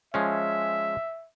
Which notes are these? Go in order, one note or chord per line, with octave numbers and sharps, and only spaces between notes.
F3 G#3 C#4 E5